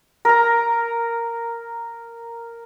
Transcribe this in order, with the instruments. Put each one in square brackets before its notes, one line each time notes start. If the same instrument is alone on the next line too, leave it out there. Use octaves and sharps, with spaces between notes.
[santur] A#4 A#5